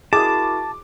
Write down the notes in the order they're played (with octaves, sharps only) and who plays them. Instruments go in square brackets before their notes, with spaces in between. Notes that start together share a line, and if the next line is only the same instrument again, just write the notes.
[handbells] E4 F#4 A#4 [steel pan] G#4 [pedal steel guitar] A5 [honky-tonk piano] D6